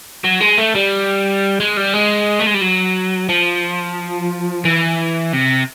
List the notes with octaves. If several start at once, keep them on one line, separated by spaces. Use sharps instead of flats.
F#3
G#3
A3
G3
G#3
G3
G#3
A3
G#3
G3
F#3
F3
E3
C3